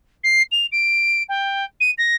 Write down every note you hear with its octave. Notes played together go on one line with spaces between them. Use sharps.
C7
F7
D7
G5
D#7
A#6